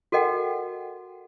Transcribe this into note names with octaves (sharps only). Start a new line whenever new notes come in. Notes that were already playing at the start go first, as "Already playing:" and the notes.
F#4 A4 A#4 D#5 F#5 G5